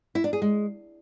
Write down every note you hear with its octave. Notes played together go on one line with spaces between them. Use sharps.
E4
D4
G#4
G#3